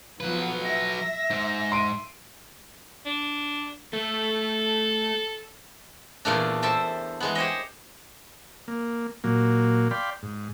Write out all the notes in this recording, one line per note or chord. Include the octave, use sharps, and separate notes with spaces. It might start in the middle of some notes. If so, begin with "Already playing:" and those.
F3 F#3 B3 B4
E5 A#6
G#2
C6 D7 D#7
D4
A3 A4
E2 A#2 A3 D4
A4 C5 E5 G5 A5
E3 G#3 B3
G4 C5 C#5 D#5
A#3
A#2 F#3 A#3
D5 F5 G5 B5 C6
G#2